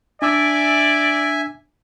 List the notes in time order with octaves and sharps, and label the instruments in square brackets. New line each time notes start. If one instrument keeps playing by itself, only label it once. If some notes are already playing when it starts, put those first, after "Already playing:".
[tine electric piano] D4 D6 E6 [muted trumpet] D5 [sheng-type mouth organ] E5 G#5